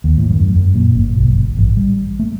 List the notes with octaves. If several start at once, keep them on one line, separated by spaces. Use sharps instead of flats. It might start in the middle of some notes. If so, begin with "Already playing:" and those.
D#2
A2
F#2
F#2
A#2
G1
B1
G1
A1
G3
A3